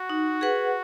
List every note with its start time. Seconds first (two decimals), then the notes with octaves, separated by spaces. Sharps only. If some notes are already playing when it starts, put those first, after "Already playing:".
Already playing: F#4
0.10 D#4
0.41 G#4 B4 F#5